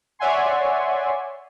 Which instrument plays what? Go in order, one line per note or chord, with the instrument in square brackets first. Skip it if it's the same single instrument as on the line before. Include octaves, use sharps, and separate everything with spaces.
[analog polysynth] C#5 D5 E5 F#5 G#5 C6